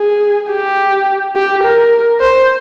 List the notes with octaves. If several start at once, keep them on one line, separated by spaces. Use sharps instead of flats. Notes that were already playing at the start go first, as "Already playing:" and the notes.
Already playing: G#4
G4
G4
A#4
C5